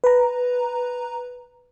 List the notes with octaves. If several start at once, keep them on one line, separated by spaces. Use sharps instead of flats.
B4 A#5